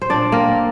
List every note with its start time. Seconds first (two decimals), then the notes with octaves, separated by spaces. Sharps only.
0.02 C5
0.10 A#2 D4 D5
0.32 A#3 C4 A#4